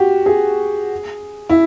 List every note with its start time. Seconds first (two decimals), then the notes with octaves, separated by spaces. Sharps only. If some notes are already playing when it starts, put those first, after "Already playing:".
Already playing: F#4 G4
0.26 G#4
1.49 E4